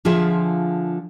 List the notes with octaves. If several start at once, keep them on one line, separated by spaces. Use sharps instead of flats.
D3 F3 F4 G#4 E5